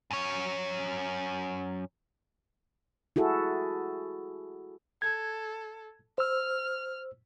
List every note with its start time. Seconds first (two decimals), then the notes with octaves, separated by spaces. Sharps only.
0.11 F#2 C#5
3.16 E4 F#4 G#4 A4
5.02 A4 G#6
6.18 C5 E6 F6